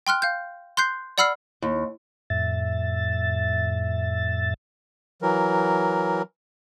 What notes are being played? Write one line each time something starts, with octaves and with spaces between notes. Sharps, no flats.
G5 C6 F6 F#6
F5 G6
C6 F#6 G6 C7
D5 F#5 B5 E6 F6 C7
D#2
F2 A2 E5 A6
E3 F#3 A#4